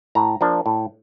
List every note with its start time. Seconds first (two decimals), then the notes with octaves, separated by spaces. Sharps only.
0.15 A2 A#5
0.41 F3 A#3 D4
0.66 A2